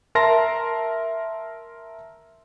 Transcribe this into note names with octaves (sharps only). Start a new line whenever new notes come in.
A#4 E5 A5 A#5 C6 A#6